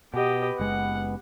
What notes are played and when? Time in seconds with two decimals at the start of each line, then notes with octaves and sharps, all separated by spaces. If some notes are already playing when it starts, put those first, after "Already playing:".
0.14 B2 B3 G4 D#5
0.59 F#1 G#3 F#5